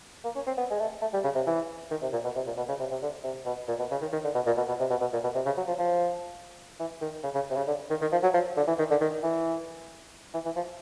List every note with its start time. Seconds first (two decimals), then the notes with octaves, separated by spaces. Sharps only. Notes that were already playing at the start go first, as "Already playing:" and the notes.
0.24 A#3
0.35 C#4
0.47 C4
0.57 B3
0.70 G#3
0.79 A3
1.02 A3
1.13 G3
1.24 C#3
1.35 C3
1.47 E3
1.91 D#3
2.02 C3
2.13 A#2
2.24 B2
2.36 C3
2.47 A#2
2.57 B2
2.68 C#3
2.79 C3
2.91 C3
3.02 D3
3.24 C3
3.46 B2
3.68 A#2
3.79 B2
3.91 C#3
4.01 D#3
4.13 D#3
4.24 D3
4.35 B2
4.46 A#2
4.57 B2
4.68 B2
4.80 C3
4.90 B2
5.01 B2
5.13 A#2
5.24 B2
5.35 C3
5.46 C#3
5.57 F#3
5.68 F3
5.79 F3
6.80 E3
7.01 D#3
7.23 C#3
7.35 C#3
7.50 C3
7.56 C#3
7.68 D3
7.90 D#3
8.02 D#3
8.12 F3
8.23 F#3
8.34 F3
8.57 D3
8.68 E3
8.79 D#3
8.90 D3
9.01 D#3
9.23 E3
10.34 E3
10.45 E3
10.56 F3